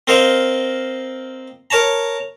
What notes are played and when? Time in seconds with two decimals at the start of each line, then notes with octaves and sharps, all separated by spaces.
0.07 C4 A#4 C5 D#5 F5 D#6
1.70 A#4 C#5 A5 A#5